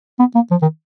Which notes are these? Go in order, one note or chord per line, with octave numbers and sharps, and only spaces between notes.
B3
A#3
F3
D#3